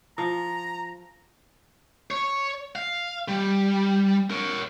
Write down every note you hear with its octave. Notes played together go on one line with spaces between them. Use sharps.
F3 A#5
C#5
F5
G3
A#4 C#5